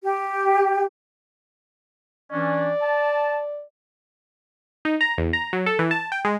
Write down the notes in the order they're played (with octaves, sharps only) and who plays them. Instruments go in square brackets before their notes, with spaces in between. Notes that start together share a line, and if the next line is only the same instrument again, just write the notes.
[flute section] G4
[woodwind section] E3 C#4 D4 [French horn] D5
[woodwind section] A5
[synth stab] D#4
A#5
E2
A#5
F#3
A4
E3
A5
G5
G#3